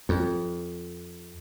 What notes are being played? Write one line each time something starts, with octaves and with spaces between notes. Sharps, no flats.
F2